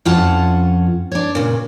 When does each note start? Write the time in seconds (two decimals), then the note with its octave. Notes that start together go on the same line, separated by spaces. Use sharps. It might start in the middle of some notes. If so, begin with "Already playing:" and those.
0.05 F2 C#4 F4 F#5 A5
1.12 D4 C#5
1.35 A#2 C#3